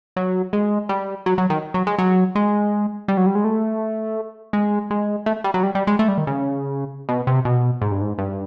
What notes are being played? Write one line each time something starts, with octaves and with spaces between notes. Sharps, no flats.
F#3
G#3
G3
F#3
F#3
D#3
F#3
G#3
F#3
G#3
G3
F#3
G3
G#3
A3
G#3
G#3
A3
G3
F#3
G3
G3
G#3
A3
G3
D#3
C#3
B2
C3
B2
G#2
G2
G#2
G2